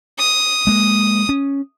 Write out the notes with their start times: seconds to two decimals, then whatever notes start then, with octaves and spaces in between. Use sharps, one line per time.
0.19 D#6
0.67 G#3 A#3
1.29 C#4